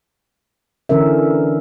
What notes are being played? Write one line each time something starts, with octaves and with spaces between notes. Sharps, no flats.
D3 E3 C#4 A#4 E5